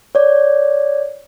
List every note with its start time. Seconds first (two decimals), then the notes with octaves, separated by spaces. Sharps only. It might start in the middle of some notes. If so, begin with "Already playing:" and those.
0.15 C#5 D5